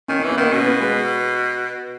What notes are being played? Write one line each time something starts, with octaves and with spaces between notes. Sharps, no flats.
D#3 C#4
E3 C#4
B3
D#3 A#3
B2 C#4
B3
G#3